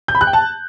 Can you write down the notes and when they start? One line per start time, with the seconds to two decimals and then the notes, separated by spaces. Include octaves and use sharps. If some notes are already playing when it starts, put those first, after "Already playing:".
0.08 G6
0.15 B5
0.21 F#6
0.27 G5
0.33 A5